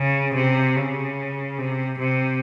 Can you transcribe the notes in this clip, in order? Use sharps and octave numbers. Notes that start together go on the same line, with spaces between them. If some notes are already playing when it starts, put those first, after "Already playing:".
Already playing: C#3
C3
C#3
C3
C3